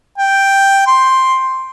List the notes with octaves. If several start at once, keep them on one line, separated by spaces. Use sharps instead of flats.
G5
C6